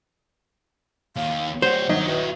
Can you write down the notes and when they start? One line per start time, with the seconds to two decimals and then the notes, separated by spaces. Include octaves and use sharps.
1.17 D#2 F5
1.62 G3 C5 C#5 F#5
1.89 G1 D#3 F#3 D#5 A#5
2.07 E4 F#4 B4